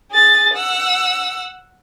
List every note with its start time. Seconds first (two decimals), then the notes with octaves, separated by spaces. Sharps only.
0.11 G#4 A6
0.53 F#5 E6